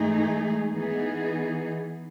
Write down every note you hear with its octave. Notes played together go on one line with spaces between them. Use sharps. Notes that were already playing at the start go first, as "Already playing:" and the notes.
Already playing: G#2 E3 A3 D#4 G#4
E3 B3 D#4 G#4